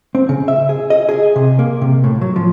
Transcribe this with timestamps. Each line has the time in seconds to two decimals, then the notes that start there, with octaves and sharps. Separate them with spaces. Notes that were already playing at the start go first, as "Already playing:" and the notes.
0.15 C4
0.29 C#3
0.48 E5
0.69 G#4
0.90 D#5
1.09 G#4
1.36 C3
1.59 A#3
1.81 C3
2.04 A2
2.21 F#3
2.36 F3